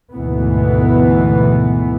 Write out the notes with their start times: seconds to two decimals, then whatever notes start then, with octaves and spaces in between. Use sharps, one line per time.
0.13 D2 G#2 B2 E3 B3